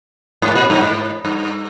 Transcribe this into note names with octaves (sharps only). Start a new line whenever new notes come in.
G#2
A#2
G2
G#2
G2